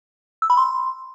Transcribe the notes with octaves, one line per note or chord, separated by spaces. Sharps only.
E6
B5
C6